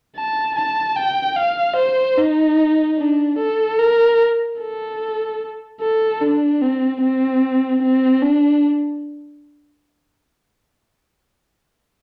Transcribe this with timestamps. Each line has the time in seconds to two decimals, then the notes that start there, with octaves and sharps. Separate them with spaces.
0.16 A5
0.56 A5
0.96 G5
1.36 F5
1.77 C5
2.18 D#4
2.98 D4
3.38 A4
3.79 A#4
4.60 A4
5.81 A4
6.21 D4
6.62 C4
7.02 C4
7.82 C4
8.22 D4